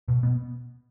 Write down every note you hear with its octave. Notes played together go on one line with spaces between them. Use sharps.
B2
B2 B3